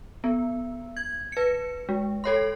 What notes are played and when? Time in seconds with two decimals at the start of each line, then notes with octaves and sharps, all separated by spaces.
0.24 B3
0.97 G#6
1.32 B4 C#7
1.89 G#3
2.24 A4 C#5 C6